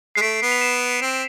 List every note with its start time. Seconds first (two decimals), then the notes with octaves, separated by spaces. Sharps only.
0.15 G#3 C7
0.21 A3 B6 D7
0.42 B3
0.52 F7
0.61 C7 E7
1.02 C4